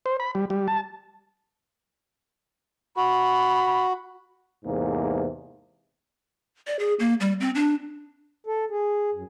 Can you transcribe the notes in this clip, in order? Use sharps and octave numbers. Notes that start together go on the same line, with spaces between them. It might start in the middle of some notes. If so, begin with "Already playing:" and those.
C5
B5
G3
G3
A5
F#4 B5
E2 G#2 C3 A#3
D5
G#4
A#3
G3
C4
D4
A4
G#4
F#2